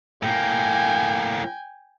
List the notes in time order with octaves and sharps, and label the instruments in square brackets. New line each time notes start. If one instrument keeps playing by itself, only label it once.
[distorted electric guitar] A2 A#3 [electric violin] G5 G#5